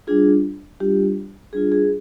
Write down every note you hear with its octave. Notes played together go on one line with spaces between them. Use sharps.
G3 D4 F4 G#4
G3 D4 F4 G4
G3 D4 F4 G#4
G#4